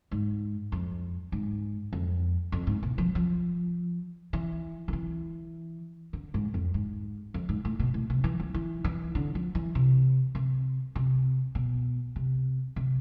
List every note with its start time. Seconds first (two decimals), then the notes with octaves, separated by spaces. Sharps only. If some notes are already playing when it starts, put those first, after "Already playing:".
0.11 G#2
0.72 F2
1.32 G#2
1.93 F2
2.52 F2
2.67 G#2
2.83 B2
2.98 F3
3.15 F3
4.33 E3
4.88 D3
4.93 E3
6.13 D3
6.34 G#2
6.54 F2
6.74 G#2
7.34 F2
7.49 G#2
7.65 A2
7.79 B2
7.94 A2
8.10 C3
8.24 E3
8.40 F3
8.54 E3
8.84 E3
9.15 D3
9.35 F3
9.55 E3
9.75 C3
10.35 C3
10.95 C3
11.55 B2
12.16 C3
12.76 C3